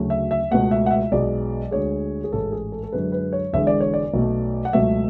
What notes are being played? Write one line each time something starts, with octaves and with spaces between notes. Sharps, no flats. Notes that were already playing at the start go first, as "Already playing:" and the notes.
Already playing: D2 C#3 F#3 A3
E5
E5
C#2 B2 A3 F#5
E5
F#5
E5
B1 B2 G#3 D5
D2 D3 G#3 C#5
G#4
A1 G#2 G#3 A4
G#4
A4
A4
F#2 D3 G#3 B4
B4
C#5
E1 E2 D3 G#3 E5
D5
C#5
D5
B1 B2 A3
F#5
C#2 B2 F#3 A3 E5